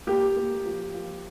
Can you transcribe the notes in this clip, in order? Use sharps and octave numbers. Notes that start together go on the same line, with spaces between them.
A#3 G4
A#3
F3
F3